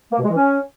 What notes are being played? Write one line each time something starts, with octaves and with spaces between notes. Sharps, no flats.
A#3
B2
G#3
E3
C#4